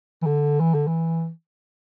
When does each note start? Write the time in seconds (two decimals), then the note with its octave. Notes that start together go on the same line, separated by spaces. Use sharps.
0.22 E3
0.26 D3
0.60 E3
0.74 D3
0.87 E3